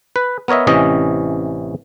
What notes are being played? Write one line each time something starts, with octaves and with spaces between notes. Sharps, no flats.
B4
B3 A#4 C#5 D#5 E5
A1 C3 E3 C#4 D#5